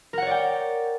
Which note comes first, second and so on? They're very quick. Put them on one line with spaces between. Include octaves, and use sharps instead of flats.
A#4 F#5 C#5 D5 G5